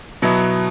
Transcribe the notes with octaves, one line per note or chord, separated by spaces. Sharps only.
B2 F#3 B3 E4